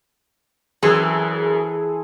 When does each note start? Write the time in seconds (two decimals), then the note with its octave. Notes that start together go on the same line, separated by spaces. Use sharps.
0.83 F#2 E3 C4 G#4 A4